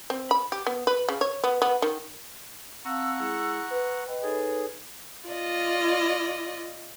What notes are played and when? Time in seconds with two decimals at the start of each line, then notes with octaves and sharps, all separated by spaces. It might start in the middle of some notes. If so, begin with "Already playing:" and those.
0.10 C4
0.31 B5
0.52 G4
0.67 B3
0.87 B4
1.09 C#3
1.21 C#5
1.44 B3
1.62 B3
1.82 D#3
2.85 C4 F5 F#5 A5 A#5 C#6 E6
3.20 G#3 E4 G#4 E6
3.70 B4 E6
4.07 B4 D#5 G5
4.23 D#4 G#4 A4 C#5
5.29 F4 D5 D#5